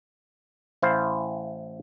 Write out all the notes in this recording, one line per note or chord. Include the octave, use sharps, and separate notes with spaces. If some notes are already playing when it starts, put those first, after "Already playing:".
A1 E4 C5 F5